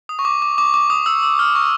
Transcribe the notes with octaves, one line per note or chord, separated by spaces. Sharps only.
D#6
C#6
D6
D6
D6
D6
D#6
E6
E6
F6
C#6